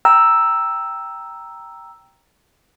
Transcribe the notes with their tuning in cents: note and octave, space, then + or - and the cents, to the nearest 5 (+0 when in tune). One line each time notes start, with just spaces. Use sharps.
G5 +0 A#5 +0 E6 +0